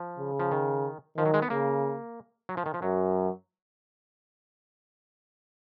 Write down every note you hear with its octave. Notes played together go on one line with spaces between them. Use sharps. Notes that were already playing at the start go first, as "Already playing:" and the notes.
Already playing: F3
C#3
F3
D#3
D#3 F3
F#3
G#3
B3
C#3 A#3
F#3
F3
D#3
F3
F#2 F#3